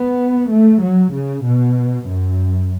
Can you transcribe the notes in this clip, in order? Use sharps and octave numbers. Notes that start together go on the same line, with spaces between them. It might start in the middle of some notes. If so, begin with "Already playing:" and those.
Already playing: B3
A3
F#3
C#3
B2
F#2